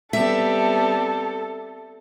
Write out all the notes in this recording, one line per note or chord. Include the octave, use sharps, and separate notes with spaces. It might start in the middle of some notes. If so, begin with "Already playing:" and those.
G3 B3 C4 A4 E5